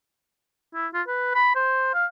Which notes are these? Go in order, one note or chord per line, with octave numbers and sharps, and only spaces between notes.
E4
F4
B4
B5
C5
F5